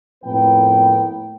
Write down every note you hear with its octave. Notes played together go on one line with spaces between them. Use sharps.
F2 A2 A#3 B3 B4 G5